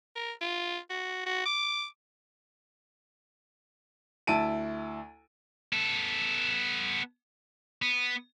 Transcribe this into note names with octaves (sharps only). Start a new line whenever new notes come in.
A#4
F4
F#4
F#4
D6
D2 E4 A5 D7 D#7
B3 A4
B3